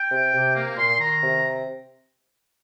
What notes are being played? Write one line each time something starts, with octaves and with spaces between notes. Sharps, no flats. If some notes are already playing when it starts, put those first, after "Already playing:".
Already playing: G5
C3
C3
A#3
A#2 C6
D#3 A#5
C3